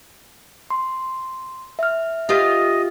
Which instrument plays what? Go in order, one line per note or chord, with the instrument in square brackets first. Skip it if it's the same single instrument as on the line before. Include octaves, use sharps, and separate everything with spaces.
[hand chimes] C6
E5 F6
[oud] F4 G4 C5 [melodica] D#5